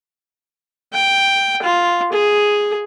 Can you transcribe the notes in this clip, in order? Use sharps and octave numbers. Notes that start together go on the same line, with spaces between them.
G5
F4
G#4